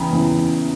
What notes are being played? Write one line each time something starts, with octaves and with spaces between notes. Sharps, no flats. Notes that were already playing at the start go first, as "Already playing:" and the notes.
Already playing: E2 C#3 E3 G5 A#5 B5
E2 C#3 E3